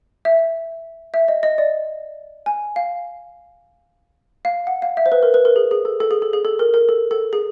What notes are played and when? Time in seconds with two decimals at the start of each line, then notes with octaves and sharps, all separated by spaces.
0.25 E5
1.14 E5
1.28 D#5
1.43 D#5
1.58 D5
2.46 G#5
2.76 F5
4.45 F5
4.67 F#5
4.82 F5
4.97 E5
5.06 C5
5.12 B4
5.23 A#4
5.34 B4
5.45 A#4
5.56 G#4
5.71 G#4
5.85 A4
6.00 A4
6.11 G#4
6.22 A4
6.33 G#4
6.45 A4
6.59 A#4
6.74 A#4
6.89 A4
7.11 A4
7.33 G#4